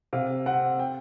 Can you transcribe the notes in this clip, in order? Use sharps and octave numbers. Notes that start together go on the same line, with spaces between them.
C3 F5
C4 F#5
G5